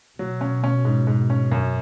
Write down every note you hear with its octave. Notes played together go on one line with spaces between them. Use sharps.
B2 F#3
C#4
C#4
G#2
G#2
C#4
F#2